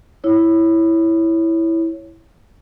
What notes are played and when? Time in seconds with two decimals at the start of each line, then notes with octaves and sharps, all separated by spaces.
0.24 E4 C#5